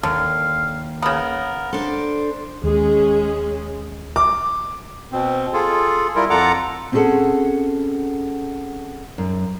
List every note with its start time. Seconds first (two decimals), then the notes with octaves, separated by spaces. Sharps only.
0.03 D#2 D3 F5
1.02 C#3 B3 A#4
1.73 D4 A4 C5
2.64 D#2 G#3 C#4 G#4
4.16 D6
5.12 B2 C4
5.53 F4 G#4 A4
6.15 G3 E4 F4 A#4
6.30 F2 F4 A4 F#5 A#5 D6
6.92 C4 C#4 F#4 G#4 A4 F#5
9.18 F#2